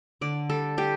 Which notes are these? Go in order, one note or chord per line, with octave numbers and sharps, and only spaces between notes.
D3 D5
G3 A4
G3 G4